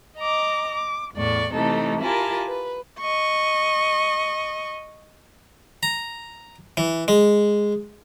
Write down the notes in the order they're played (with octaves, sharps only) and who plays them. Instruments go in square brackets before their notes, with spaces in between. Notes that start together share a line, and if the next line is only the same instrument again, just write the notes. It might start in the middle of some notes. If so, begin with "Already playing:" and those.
[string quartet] D#5 A#5 D6
D6
E2 A2 D5 C#6
C3 E3 A3 D#4 A4
E4 F4 G4 A#4 G#5 A5
B4
[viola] D#5 C#6
[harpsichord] A#5
E3
G#3